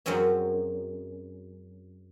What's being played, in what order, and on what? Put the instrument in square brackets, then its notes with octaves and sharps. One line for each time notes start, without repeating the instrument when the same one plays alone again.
[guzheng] F#2 F#3 G#3 C4 C#4